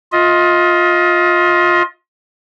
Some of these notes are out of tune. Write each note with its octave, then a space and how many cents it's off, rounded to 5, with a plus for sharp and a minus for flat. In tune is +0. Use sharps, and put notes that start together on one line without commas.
F4 +15 D#5 +30